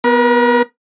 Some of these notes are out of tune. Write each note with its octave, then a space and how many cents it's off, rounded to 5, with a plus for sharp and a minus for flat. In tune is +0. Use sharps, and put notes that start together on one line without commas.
B3 +0 A#4 +40